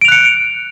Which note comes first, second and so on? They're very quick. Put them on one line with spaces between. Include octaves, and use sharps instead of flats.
D7 F7 F#6 C#7